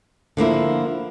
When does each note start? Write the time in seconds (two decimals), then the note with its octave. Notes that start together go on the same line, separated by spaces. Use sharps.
0.37 D3 F3 A#3 E4